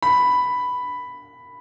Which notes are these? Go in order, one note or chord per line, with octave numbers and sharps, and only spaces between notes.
B5